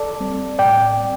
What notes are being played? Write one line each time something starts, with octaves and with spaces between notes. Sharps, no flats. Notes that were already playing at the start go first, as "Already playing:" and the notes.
Already playing: A4 D5
G3 C4
A2 D5 G5
G3 C4